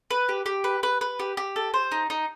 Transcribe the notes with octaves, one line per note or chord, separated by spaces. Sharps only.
B4
G4
G4
B4
B4
B4
G4
G4
A4
C5
D#4
D#4